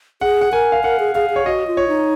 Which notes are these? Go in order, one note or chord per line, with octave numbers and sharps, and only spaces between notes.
G#4 F#5
F#5
A#4 G#5
F5
A#4 F#5
G#4
G#4 F5
G#4
C#5
F#4 D#5
F4
C#5
D#4